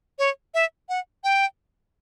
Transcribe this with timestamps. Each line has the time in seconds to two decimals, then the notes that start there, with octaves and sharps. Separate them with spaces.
0.19 C#5
0.54 E5
0.89 F#5
1.24 G5